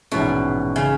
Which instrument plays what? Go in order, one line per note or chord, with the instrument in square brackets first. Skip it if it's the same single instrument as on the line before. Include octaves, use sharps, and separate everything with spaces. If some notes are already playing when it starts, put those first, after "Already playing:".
[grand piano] A#1 G#2 E3 G#3 C#4 [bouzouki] B2
[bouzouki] C#3